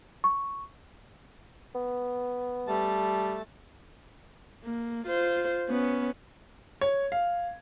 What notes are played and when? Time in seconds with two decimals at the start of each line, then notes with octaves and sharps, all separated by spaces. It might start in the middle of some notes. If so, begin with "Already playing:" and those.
0.24 C#6
1.75 B3
2.67 G3 A3 A5
4.64 A#3
5.06 F4 C5
5.69 B3 C#4
6.81 C#5
7.12 F5